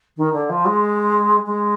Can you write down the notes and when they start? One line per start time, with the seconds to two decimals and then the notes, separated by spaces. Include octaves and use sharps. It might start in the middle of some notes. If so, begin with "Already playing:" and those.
0.17 D#3
0.33 D3
0.49 F3
0.65 G#3
1.46 G#3